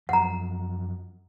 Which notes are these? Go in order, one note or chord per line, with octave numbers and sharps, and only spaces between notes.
F#2 F3 F#5 A#5